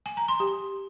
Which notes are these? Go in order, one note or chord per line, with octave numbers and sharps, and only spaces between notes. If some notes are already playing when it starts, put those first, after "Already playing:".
G#5
A#5
C6
G4